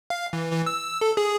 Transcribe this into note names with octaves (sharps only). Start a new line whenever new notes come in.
F5
E3
E3
E6
A4
G#4